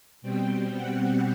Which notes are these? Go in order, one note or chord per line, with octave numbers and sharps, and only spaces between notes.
B2 G3 C4 G5
F#5